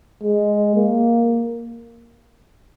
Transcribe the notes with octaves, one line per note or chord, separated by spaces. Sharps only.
G#3
A#3